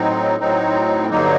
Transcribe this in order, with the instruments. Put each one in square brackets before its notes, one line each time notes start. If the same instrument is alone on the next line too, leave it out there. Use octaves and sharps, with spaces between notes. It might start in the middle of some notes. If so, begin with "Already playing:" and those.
Already playing: [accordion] A2 F#3 C4 D#4
A2 F#3 C4 D#4
G2 D3 F#3 A#3 D#4